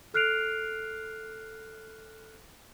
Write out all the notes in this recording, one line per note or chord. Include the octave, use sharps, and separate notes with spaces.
A4 F6 F#6 C7 D7 F7